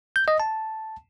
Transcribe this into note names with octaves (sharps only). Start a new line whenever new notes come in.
G6
D#5
A5